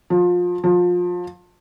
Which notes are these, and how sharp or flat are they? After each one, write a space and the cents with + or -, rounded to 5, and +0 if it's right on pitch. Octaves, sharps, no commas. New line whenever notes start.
F3 +25
F3 +25